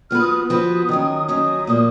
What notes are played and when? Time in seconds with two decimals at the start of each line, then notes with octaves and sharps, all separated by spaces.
0.10 F3 B3 F#4 B4 F6
0.20 D#6
0.30 D#6
0.49 F3 B3 F#4 B4 D#6
0.89 D#3 F#3 C#4
1.28 D#3 F#3 C#4 D#6
1.67 A#2 F3 A#3